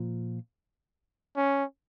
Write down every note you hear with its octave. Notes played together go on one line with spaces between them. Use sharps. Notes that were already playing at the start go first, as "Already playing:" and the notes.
Already playing: A#2 F3
C#4